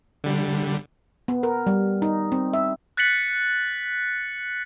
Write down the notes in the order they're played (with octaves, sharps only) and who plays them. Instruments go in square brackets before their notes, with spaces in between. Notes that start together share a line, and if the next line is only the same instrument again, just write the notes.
[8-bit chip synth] D3 G3
[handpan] B3
A#4
G3
D#4
C4
E5
[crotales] F#6 A6 B6 C#7 F#7